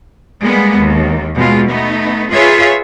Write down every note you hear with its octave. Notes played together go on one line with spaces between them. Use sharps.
G3 G#3 A#3 B3
D#2
B2 G#3 F4
A3 B3 D#4
F4 G#4 B4 C#5 E5